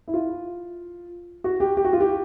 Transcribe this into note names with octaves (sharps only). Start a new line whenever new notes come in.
E4
F4
F#4
G4
G4
F#4
F4
G4